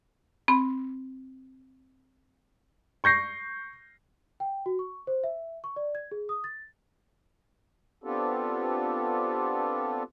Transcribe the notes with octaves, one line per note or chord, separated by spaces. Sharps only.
C4 B5
C#6 G6 A#6 C7
G5
F#4
C#6
C5
E5
C#6
D5
G#6
G#4
D#6
A6
B3 C4 D4 F4 G4 A4